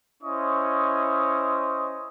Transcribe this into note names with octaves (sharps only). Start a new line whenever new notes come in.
C#4 E4 C5 D#5 C#6 D#6